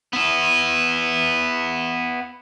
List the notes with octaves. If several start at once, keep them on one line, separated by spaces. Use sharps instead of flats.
B3 E4